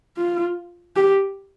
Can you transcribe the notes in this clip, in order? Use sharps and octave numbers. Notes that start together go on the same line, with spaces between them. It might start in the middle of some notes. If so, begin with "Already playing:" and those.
F4
G4